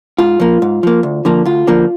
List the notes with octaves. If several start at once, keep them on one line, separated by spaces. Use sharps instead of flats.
G#2 F4
F3 A#3
G#2
F3 A#3
D2
D3 F3 A#3
D2 F4
D3 F3 A#3